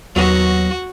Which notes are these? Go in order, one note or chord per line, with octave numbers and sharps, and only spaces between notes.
D#2 F#3 B3 F#4 A#6